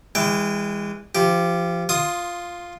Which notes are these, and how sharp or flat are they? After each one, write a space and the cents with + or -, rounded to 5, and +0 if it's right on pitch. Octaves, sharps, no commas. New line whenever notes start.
E3 +0 G#3 -30 G5 +5
F3 -25 G4 +0
F4 +0 C6 +20 D#6 +0